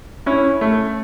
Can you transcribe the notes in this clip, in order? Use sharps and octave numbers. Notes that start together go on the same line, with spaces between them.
C#4 E4
A3